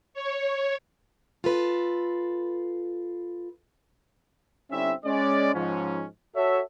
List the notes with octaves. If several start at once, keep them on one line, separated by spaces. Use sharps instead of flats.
C#5
F4 A4 B4
D3 G3 C4 C#4 E4 E5
G#3 C#4 D5
G#2 F3 C#4
F#4 A4 C#5 E5